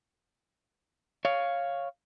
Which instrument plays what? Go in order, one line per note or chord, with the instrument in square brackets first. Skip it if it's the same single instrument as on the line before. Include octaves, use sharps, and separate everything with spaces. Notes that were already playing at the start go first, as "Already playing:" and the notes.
[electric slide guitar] C#5 F5